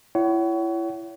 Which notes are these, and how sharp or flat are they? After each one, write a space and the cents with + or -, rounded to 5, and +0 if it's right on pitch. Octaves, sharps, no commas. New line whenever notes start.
E4 +25 C#5 +25 F#5 +40